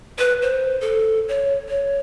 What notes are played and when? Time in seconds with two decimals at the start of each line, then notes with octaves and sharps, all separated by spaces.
0.19 B4
0.42 C5
0.81 A4
1.28 C#5
1.69 C#5